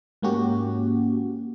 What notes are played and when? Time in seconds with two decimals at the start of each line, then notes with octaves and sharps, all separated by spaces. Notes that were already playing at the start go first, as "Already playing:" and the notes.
0.22 G#2 A#3 C#4 F#4 G4